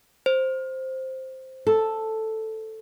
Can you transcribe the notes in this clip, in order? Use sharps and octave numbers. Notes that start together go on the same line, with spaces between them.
C5
A4